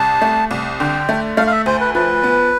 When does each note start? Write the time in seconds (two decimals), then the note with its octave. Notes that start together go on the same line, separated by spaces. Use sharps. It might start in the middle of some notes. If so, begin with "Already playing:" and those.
Already playing: C2 A5
0.22 A3
0.51 C2
0.80 D3 G5
1.09 A3
1.37 A3 F5
1.47 F5
1.52 E5
1.66 D2 C5
1.81 B4
1.95 F3 B4
2.23 B3